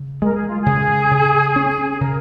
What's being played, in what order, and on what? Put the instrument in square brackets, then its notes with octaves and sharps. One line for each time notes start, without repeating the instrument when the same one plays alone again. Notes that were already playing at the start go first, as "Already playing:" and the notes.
Already playing: [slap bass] C#3
[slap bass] G#3 [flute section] A#4
[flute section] G#4
F4
[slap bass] C#3 [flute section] G#4
[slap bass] C#3
C#4
[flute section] G#4
[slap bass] C#3 [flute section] A#4